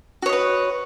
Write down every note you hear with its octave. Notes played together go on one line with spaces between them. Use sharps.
F#4 B4 C#5 D#5